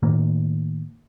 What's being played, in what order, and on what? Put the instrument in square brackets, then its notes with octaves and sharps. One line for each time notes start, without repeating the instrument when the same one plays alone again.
[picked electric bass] A2 D#3 A#3